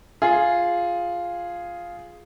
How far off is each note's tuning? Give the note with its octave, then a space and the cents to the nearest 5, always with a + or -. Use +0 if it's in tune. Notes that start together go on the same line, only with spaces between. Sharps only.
F4 +0 G#4 +0